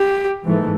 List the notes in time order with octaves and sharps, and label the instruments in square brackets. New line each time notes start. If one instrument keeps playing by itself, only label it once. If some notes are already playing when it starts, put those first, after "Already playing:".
Already playing: [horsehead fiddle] G4
[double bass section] G#2 E3 A3